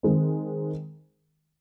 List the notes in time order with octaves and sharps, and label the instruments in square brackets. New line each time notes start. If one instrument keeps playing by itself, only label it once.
[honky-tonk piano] D#3 G#3 C4